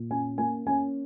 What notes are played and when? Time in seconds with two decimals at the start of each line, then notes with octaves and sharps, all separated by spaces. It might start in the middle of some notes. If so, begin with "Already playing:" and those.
Already playing: A#2
0.11 C#4 G#5
0.38 A#3 G#5
0.67 C#4 G#5